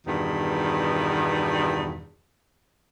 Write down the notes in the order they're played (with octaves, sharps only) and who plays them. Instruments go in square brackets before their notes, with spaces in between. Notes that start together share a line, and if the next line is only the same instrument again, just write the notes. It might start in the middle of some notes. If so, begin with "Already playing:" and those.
[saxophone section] E2 G2 B2 D#3